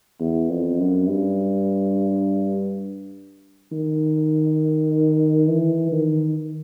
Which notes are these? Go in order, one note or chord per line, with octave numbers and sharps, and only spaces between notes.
E2
F2
F#2
G2
D#3
E3
D#3